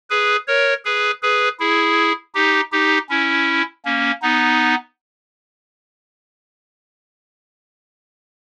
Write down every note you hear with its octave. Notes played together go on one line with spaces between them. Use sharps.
G#4 B4
A#4 C#5
G#4 B4
G#4 B4
E4 G#4
D#4 G4
D#4 G4
C#4 E4
A#3 C#4
B3 D#4